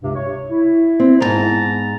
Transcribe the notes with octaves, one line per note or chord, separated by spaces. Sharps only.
C#2 G2 C3
C#5
E4
C4
D2 G#2 B3 A5 A#5